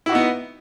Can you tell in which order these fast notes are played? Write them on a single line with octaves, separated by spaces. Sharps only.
E4 F#4 D#4 B3